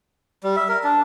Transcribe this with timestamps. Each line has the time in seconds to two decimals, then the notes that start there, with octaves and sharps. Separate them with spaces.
0.44 G3
0.56 E5
0.69 A#4
0.84 D4